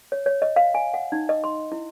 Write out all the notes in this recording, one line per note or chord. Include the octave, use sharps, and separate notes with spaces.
C#5
C#5
D#5
F5
G#5
F#5
D#4
D#5
C6
E4